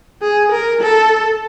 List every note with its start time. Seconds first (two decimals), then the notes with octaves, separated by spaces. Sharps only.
0.22 G#4
0.52 A#4
0.82 A4